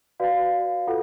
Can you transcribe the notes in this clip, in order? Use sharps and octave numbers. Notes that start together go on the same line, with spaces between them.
F#4 B4 D5 F5
F4 A4 F#5